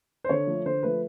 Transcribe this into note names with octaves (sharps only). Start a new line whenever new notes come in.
C5
D3 C#5
F3 A3
D3 C5
F3 A3 B4